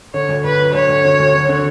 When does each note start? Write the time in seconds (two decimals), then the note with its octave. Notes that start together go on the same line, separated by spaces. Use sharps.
0.14 D3 C#5
0.29 D2
0.44 D2 B4
0.59 F#3
0.73 D2 C#5
0.89 D2
1.04 D3
1.19 D2
1.34 D3
1.49 D3